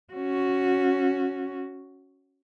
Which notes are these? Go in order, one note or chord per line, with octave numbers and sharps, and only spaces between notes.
C#4 F#4